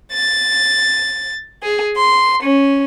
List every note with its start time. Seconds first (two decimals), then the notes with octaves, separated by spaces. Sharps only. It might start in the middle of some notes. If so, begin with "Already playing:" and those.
0.11 A6
1.61 G#4
1.95 C6
2.41 C#4